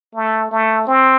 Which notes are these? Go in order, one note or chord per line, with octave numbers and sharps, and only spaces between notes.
A3
A3
C4